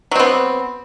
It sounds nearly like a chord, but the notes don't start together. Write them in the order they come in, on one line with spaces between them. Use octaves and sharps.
F#3 C4 B3